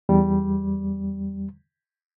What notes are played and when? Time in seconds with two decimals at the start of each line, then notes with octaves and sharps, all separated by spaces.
0.09 E2 G3